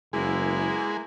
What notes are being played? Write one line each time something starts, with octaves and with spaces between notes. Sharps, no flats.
F#1 G#3 A#3 B3 E4